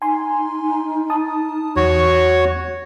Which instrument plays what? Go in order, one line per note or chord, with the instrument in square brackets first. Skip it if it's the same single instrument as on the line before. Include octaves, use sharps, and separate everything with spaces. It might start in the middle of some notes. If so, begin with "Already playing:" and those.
[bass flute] D#4 [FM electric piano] G#5 C6
[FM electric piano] A5 D#6
[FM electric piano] E2 [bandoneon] F#4 C#5